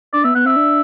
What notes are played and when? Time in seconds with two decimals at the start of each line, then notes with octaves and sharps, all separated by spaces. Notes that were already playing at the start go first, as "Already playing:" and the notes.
0.13 D4 D5
0.24 B3 E5
0.35 B3 F#5
0.45 C4 E5
0.56 D4